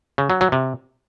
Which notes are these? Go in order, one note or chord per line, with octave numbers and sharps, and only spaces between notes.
C#3
F#3
F#3
C3